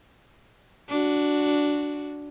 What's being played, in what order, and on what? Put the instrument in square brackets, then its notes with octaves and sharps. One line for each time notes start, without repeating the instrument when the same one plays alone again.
[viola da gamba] D4 F#4